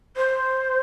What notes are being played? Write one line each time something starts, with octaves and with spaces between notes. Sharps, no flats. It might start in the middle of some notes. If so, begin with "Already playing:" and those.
C5